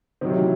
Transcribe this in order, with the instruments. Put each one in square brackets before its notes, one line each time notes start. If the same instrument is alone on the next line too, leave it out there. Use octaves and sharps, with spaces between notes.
[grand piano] C3 F#3 C4 [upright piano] D#3
[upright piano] E3